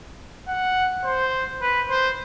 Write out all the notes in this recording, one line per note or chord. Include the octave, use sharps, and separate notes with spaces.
F#5
C5
B4
C5